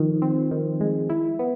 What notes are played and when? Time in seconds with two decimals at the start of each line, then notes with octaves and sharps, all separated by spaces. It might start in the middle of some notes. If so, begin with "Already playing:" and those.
Already playing: D#3 F3
0.22 C4
0.51 D#3
0.81 G#3
1.10 E4
1.39 B3